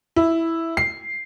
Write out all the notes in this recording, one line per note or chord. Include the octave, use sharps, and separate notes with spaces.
E4
C7